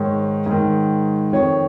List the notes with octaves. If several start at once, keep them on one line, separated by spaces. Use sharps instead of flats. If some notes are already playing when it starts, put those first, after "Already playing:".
Already playing: G#2 D#3 C#5
G#2 D#3
F2 D#3 C#5